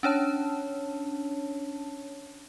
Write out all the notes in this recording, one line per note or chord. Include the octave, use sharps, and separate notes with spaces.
C#4 D4 C#5 A5